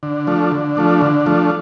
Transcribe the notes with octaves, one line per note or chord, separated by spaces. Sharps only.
D3
F3 A3 D4
D3
F3 A3 D4
D3
F3 A3 D4